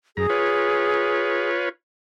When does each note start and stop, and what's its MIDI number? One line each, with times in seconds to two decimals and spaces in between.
0.17 0.27 42
0.17 1.50 68
0.17 0.27 82
0.29 1.69 65
0.29 1.69 71
0.29 1.69 73